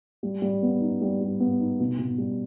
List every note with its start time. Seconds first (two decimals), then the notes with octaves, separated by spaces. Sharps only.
0.23 G3
0.42 G3
0.63 B3
0.81 D#4
1.01 G3
1.21 G3
1.40 B3
1.60 D#4
1.80 B2
1.98 B2
2.18 G3